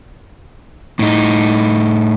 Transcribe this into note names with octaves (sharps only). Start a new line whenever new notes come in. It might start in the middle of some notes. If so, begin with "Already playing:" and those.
A2 D#4